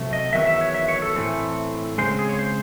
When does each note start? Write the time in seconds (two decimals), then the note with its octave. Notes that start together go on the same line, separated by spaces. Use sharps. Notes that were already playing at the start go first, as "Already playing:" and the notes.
Already playing: C3 F#3 A3
0.13 D#5
0.33 E2 D#3 F#3 E5
0.47 E5
0.61 C#5
0.74 E5
0.88 C#5
1.02 A4
1.16 A2 E3 A3 C4
1.98 C#3 G#3 C4 C5
2.19 G#4
2.29 C#5
2.39 C5